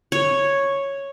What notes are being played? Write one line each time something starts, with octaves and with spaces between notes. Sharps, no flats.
C#5